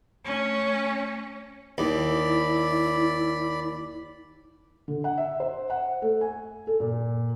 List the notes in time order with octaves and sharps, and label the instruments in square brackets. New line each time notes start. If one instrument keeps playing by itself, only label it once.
[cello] A3 C#4
[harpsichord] D#2 [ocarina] E4 [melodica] D5 B5
[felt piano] D3
F#5
E5
C5
F#5
A3
G#5
A4
A#2